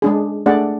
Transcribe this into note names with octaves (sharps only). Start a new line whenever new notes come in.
G#3 D4 G#4
A3 D4 G#4 D5 F#5